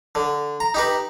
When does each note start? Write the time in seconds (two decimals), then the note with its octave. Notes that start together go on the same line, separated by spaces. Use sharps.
0.15 D3
0.60 A#5
0.74 D#4 G4 B4